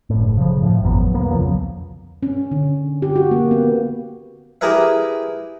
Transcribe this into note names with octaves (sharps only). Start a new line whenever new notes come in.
F#1 A2
C#3 F3
A2 F3
G#1 F2 F#3 B3
C2 A#3 B3
E2 C#3 F3 F#3
C#4
D3
G4
F#4
A#3
B3
E4 G4 G#4 A#4 B4 E5